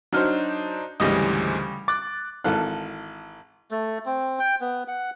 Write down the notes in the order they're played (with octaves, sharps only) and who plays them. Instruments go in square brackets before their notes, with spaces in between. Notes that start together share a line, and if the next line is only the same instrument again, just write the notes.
[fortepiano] F#3 F6 [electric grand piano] D4 D#4 C5
[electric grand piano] D2 G#2 E3 [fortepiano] C#3 G3 D#5
[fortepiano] D6 [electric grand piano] F#6 A6
[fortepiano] G#1 E3 A4 F5 F#6
[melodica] A3
C4
G5
B3
F#5